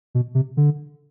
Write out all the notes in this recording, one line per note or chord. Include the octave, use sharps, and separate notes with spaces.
B2
C3
D3